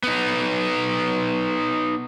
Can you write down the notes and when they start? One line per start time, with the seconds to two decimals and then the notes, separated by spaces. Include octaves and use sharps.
0.03 B3 D#4